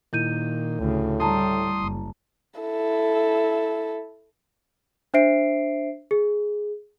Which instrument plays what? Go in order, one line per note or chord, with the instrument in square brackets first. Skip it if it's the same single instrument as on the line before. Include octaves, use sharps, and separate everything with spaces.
[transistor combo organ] A#2 D#3 [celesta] E4 G6 D#7
[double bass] D2 C#3 [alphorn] A2
[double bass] G3 [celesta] E4 A5 A#5 [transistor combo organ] C6 D#6
[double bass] F#1
[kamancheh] E4 A4
[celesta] D4 C5 E5 C7 D7
G#4